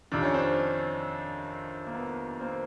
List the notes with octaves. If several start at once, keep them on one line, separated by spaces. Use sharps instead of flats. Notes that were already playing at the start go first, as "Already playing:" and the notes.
F2 C3 D#3 D4
C#4
C4 D4
A#3
B3
A#3 C4